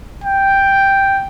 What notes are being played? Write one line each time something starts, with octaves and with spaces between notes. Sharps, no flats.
G5